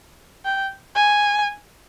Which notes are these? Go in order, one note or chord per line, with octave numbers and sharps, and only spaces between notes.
G5
G#5